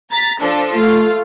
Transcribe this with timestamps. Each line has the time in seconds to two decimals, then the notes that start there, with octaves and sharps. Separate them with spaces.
0.11 A#5 A6 B6
0.42 F3 D4 A4
0.74 A3 F4